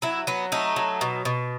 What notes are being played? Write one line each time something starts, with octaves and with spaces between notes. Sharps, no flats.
F#3 E4
F#3 B3
A3 D#4
F#3
B2
B2